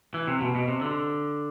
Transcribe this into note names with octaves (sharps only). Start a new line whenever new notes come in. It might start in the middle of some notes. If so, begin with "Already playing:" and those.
E3
C3
B2
B2
C3
D3